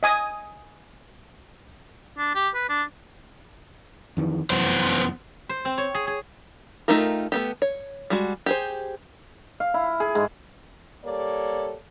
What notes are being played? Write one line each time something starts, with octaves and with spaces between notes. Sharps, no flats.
D#5 G#5 D#6
D4
G4
B4
D4
F2 D#3 E3
F1 F#2 E3 B3 C5
C5
C4
C#5
G#4
G#4
A3 D#4 F4 G4 A#4
A3 B3 G4
C#5
G3 G#3 F#4
G4 G#4 C5
F5
E4
G#4
G#2
G3 A#3 A4 C#5 D5